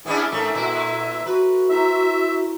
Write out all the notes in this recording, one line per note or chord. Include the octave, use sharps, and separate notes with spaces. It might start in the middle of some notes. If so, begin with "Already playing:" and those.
B3 C#4 D4 E4 G#4
G#2 A3 C#4 A4 A#4 E5
A#2 E4 C6
F#4 B4
E4 C5 E5 A#5